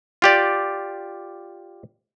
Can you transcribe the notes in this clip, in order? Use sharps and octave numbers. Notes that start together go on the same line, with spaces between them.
F4 G4 D5